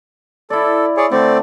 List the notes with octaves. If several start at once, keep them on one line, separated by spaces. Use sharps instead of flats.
E4 A4 D5
G#4 C#5 D5
D3 A3 C4 D5